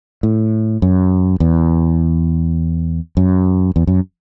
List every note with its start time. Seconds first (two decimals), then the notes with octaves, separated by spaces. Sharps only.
0.23 A2
0.82 F#2
1.40 E2
3.17 F#2
3.76 E2
3.87 F#2